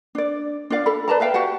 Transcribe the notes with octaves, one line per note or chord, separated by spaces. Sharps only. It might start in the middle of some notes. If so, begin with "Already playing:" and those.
D4 D5
D4 F4 D5 F5
A4 B5
B4 D5 A5 A#5
B4 E5 F5 G5
F#4 G4 F#5 A5